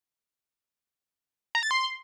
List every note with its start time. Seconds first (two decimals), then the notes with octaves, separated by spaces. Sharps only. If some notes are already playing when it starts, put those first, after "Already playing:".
1.55 A#5
1.63 A6
1.71 C6